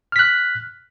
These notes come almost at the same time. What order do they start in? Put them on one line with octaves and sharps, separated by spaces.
F6 B6 F#6